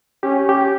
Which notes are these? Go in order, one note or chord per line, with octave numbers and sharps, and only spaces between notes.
C#4 G4
G4